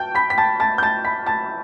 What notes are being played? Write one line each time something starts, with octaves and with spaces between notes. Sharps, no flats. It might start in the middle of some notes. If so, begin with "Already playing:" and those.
Already playing: F#3 G5 A5 G6
B5 B6
B6
A5 A6
A5 A6
G6
A5 A6
B5 B6
A5 A6